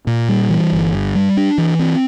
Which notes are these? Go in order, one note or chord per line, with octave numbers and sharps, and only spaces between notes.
A#2
G3
E3
G1
G2
G3
D4
E3
C4